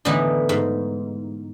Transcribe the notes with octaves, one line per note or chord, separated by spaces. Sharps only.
A2 D3 E3 B3 D#4
G#2